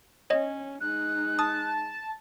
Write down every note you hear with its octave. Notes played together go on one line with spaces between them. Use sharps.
C#4 C#5 D#5
G#3 D#4 F#6
A5 D#6